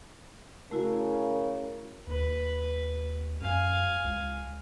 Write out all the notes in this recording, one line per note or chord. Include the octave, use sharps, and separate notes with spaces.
C#3 A3 E4 F#4 A#4
D#2 B4
F#2 F5 G#5
C#2